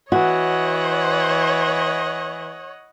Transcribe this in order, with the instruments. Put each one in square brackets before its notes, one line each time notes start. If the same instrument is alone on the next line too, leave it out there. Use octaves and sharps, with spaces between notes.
[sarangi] E3 [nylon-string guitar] F#4 [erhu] C#5 [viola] D#5 F#5